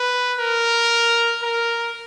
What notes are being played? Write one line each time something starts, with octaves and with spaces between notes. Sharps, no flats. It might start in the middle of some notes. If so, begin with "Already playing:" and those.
Already playing: B4
A#4
A#4